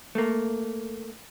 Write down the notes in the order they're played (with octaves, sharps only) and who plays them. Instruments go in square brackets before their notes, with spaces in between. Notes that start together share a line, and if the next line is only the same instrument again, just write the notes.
[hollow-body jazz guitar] A3 A#3